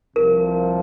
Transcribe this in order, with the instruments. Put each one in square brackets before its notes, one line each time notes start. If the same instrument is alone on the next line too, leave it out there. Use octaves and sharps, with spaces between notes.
[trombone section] C2 C3 F3 [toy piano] A#4